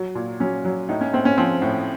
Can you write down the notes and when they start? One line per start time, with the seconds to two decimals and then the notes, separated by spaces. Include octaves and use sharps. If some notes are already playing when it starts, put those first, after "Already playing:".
Already playing: F#3
0.15 A#2
0.40 F#3 C#4
0.64 F#3
0.89 A2 D#4
1.01 C#4
1.13 A2 C4
1.25 C#4
1.38 F3 C4
1.62 A2